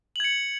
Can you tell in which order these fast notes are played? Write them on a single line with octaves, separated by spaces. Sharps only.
F#7 G#6 C#7